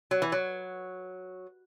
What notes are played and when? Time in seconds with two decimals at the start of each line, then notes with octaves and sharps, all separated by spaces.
0.11 F#3
0.22 E3
0.32 F#3